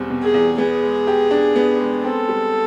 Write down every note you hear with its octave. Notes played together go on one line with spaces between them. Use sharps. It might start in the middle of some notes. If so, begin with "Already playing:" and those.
Already playing: E2 B2 G3 C4
B2
G#4
E2
B3 G#4
G#3
G4
D4
B3
G#3
C4 A4
G3